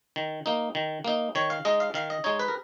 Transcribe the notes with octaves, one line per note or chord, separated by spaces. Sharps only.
D#3
A#3 D#4
D#3
A#3 D#4
D#3 C#5
F5
G#3 D#4 D#5
F5
D#3 F5
D#5
G#3 D#4 C#5
B4
A#4